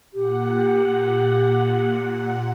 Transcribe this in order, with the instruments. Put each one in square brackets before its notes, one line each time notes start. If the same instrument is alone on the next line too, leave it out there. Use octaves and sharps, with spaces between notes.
[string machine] A#2 F#5 [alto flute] G4